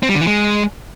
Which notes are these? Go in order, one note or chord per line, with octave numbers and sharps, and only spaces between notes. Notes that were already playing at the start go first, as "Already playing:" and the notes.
C4
G3
D3
E3
G#3